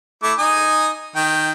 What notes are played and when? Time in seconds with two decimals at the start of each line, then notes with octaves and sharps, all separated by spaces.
0.23 A3 E4 D6
0.39 D#4 G#5 D#6
1.16 D#3 G5